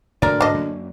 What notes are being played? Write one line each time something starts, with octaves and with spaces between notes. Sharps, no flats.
D2 A2 A#4 D5
G#2 D4 D#5
F#2 F#3 A#3